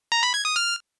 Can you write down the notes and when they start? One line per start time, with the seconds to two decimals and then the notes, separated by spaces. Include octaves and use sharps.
0.12 A#5
0.23 B5
0.34 G#6
0.45 D#6
0.56 F6